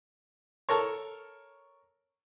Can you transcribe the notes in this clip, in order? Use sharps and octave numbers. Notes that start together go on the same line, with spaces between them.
A4 A#4 C#5